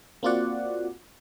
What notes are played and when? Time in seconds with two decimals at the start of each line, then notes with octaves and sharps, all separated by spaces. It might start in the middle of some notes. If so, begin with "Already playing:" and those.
0.23 A#3 C4 F4 F#4 D5 F#5